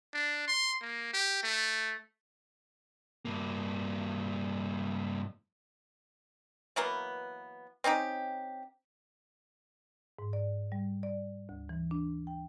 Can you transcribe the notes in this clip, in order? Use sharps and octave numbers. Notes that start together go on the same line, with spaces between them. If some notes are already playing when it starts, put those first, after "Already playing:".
D4
C6
A#3
G4
A3
G2 A#3
E3 F#3 A#3 B3
C4 C#4 D#4 G4
G#2
D5
G3
D5
D2
E3
D4
G5